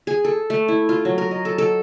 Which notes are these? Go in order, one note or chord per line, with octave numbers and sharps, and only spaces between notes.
G#4
A4
A3
E4
F4
F#3
A#4
D#5
A4
A4